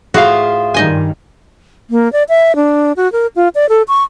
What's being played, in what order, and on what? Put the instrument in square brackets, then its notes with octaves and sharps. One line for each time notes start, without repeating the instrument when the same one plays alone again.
[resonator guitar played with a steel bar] A2 F4 F5 [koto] F#4 [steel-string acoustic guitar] G#4 C5 E5
[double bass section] G2 D#3 G3 [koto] D#4 D#5 G#5
[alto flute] A#3
D5
E5
D4
F#4
A#4
F4
D5
A4
C#6